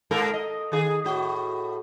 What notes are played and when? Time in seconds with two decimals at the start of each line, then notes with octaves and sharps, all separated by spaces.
0.11 G#2 A4 A#4
0.34 D#5
0.72 D#3 G#4
1.05 A2 F#4